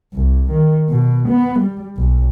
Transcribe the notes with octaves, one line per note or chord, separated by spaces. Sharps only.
C2
D#3
B2
B3
G3
B1